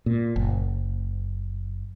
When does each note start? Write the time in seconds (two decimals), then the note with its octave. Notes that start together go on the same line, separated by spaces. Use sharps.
0.06 A#2
0.36 F#1